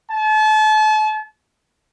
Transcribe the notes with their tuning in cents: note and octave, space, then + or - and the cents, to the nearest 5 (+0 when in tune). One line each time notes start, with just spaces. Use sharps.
A5 -35